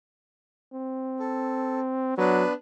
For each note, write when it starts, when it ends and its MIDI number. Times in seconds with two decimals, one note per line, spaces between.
0.73 2.15 60
1.20 1.79 69
2.18 2.44 54
2.18 2.53 59
2.18 2.53 62
2.18 2.53 71